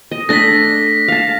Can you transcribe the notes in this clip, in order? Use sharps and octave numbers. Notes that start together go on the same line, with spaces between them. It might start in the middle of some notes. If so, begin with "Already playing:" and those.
D#5
A3 D4 A#6 B6
F5 A5